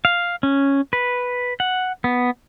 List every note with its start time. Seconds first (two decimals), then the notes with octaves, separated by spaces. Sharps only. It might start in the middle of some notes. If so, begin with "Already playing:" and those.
0.05 F5
0.43 C#4
0.93 B4
1.60 F#5
2.04 B3